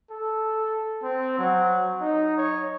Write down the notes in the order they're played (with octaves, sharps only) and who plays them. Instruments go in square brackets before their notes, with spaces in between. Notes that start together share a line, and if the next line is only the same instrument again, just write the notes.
[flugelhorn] A4
C4
F#3
D#4
C#5